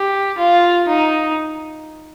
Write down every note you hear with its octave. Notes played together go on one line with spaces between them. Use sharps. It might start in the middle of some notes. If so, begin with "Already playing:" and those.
Already playing: G4
F4
D#4